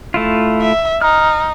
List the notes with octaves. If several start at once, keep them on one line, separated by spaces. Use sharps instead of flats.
A3 E4 F4
E5
D#4 F6